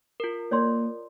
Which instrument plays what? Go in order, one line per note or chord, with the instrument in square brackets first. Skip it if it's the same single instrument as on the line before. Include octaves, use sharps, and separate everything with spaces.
[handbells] F4 A#4
[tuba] A#3 [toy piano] C#5 D5 C6